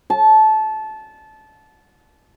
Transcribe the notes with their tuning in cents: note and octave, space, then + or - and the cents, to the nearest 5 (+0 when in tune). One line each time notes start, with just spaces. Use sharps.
A5 -20